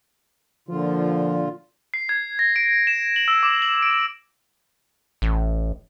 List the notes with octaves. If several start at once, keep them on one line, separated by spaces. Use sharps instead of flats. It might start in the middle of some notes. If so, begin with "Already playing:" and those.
A#2 D3 F3 F4
C7
G#6
A#6
D7
E7
F#7
E6
D6
F#7
D7
A1